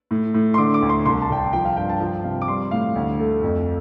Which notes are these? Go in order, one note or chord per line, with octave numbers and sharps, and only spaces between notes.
A2
A2
C6
D3 D6
D6
D2
C6
C2 C6
A5
C2 G5
A5
F3 G5
F5
G2 G5
A5
F3 G5
C3 F5
D6
G3 C6
A2 F5
D2
A3
F2